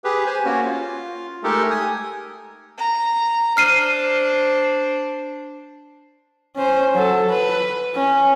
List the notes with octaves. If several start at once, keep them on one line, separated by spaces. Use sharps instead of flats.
G4 G#4 B4
C5 G#5
A#3 C#4 F#4
F4
G#3 A3 D#4 G4 A4 A#4
G#5 D#6
A#5
D4 C5 F6 C7 D#7
C#4 C5
F#3 A4
B4
C#4